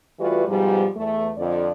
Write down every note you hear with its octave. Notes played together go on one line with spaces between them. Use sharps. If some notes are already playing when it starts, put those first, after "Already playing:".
E3 G3 A3 F4 F#4 B4
G#2 B2 F3 G3
E2 A3
F2 D3 D5